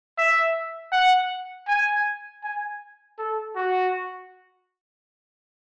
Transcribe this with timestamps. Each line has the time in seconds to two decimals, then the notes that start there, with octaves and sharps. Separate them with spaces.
0.18 E5
0.92 F#5
1.68 G#5
2.44 G#5
3.18 A4
3.56 F#4